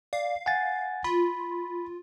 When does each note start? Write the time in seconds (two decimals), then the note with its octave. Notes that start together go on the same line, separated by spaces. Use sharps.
0.13 D5 F5
0.46 F#5 G#5 A6
1.04 F4 B5